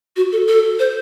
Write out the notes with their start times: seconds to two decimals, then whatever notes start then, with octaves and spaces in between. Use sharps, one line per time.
0.16 F#4
0.32 A4
0.48 A4
0.79 C5